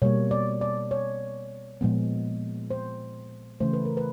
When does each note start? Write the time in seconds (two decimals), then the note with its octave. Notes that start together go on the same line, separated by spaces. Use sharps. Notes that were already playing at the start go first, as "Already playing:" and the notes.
0.02 B2 G3 A#3 C#5
0.31 D5
0.61 D5
0.91 C#5
1.81 A#2 F3 G#3 B3
2.71 C5
3.60 C#3 E3 A3 C5
3.73 B4
3.85 A#4
3.97 B4